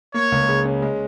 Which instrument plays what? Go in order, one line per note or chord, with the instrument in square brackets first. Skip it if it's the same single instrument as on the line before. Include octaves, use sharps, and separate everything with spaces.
[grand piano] A#3 [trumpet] C#5
[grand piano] C#2
C#3
C#4
G#3